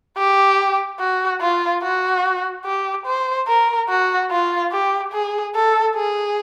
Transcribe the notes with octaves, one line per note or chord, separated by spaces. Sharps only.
G4
F#4
F4
F#4
G4
C5
A#4
F#4
F4
G4
G#4
A4
G#4